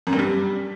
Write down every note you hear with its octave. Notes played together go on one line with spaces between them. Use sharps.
F#2
G2
G3